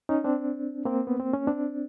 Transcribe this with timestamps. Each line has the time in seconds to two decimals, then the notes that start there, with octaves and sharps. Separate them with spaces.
0.09 C#4 D#4
0.24 C4 D4
0.85 A#3 C4
1.07 B3
1.20 C4
1.33 C#4
1.47 C4 D4